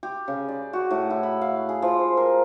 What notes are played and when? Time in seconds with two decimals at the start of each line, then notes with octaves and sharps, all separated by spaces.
0.03 G4
0.28 C#3
0.48 D5
0.73 F#4
0.90 A2
1.10 E4
1.23 B5
1.41 F5
1.69 G#4
1.82 F3
1.99 C5
2.17 A#4